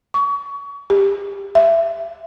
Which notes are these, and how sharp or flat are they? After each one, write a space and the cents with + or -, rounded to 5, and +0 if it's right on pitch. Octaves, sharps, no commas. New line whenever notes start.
C#6 +30
G4 +25
E5 +20